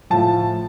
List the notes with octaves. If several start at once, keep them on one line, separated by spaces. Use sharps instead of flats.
A2 F3 A5